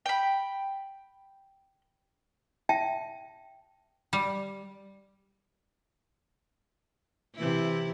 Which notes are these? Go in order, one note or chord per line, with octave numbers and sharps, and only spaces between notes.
G5 B5
E5 G5 A5
G3
C3 E3 E4